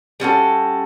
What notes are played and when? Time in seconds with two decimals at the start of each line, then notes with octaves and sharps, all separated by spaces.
0.20 G3 C#4 F#4 A4